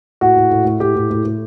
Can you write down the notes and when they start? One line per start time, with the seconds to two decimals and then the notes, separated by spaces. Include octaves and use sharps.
0.21 A2 F#4
0.36 A2
0.51 A2
0.65 A2
0.80 A2 G4
0.95 A2
1.11 A2
1.25 A2